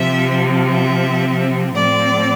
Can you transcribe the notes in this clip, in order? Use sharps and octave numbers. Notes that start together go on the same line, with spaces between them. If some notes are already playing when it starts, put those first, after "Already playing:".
Already playing: C3 F3 C4 E5
E5
A2 F3 C4 D5